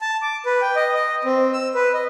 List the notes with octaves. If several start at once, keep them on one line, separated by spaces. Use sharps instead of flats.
A5
D6
B4
G5
D#5
D#5
C4
E6
B4
D#5